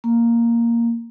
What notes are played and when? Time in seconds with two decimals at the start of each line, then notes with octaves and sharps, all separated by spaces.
0.04 A#3